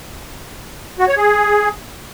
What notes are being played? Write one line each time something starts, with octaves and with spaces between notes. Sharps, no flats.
F#4
C#5
G#4